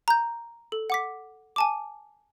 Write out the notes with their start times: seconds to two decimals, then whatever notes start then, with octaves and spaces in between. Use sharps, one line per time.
0.08 A#5 G6
0.72 A4
0.90 F#5 D6 B6
1.56 G#5 A5 D6